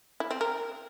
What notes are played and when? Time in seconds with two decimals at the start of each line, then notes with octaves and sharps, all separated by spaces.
0.20 E4
0.31 C4
0.41 A#4